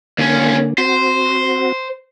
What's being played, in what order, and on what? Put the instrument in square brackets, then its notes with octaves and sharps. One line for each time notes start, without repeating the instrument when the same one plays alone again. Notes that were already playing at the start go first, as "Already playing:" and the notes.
[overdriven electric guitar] D#2 C#4 [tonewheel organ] D3 A#3
[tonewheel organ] C4 F#4 [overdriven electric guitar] C5